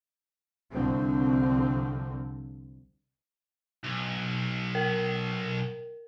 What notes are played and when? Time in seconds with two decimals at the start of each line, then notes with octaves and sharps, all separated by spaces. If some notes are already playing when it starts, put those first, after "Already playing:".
0.73 C2 D3 F3 C4
3.84 B1
4.75 A#4